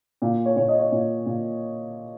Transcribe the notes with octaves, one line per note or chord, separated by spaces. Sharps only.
A#2
C#5
A#2 C#5
D#5
C#5
A#2
A#2